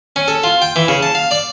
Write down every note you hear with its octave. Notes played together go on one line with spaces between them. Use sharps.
C#4
A4
F4
G5
E3
C#3
A5
F5
D5